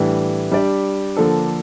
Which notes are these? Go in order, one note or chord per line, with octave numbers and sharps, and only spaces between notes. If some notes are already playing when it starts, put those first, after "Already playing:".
Already playing: A2 E3 G3 D4
G3 D4 G4 D5
D3 F3 A#3 D4 A4